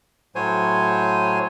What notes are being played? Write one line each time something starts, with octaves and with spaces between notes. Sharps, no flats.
A2 F#3 C5 C#5 G#5